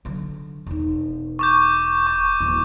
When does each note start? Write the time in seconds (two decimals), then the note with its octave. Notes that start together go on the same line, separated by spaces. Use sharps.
0.05 D3 F#3
0.66 E1 D#4
1.39 C#6 D6 G6
2.07 C#6
2.40 D#1 F3